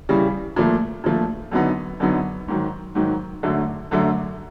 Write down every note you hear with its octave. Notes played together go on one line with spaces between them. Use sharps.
C#3 E3 G3
A#2 F3 A3
A#2 F3 A3
F#2 D3 F#3 B3 D#4
F#2 D3 F#3 B3 D#4
G#2 D#3 F#3
G#2 D#3 F#3
F#2 D3 F#3 A3
F#2 D3 F#3 A3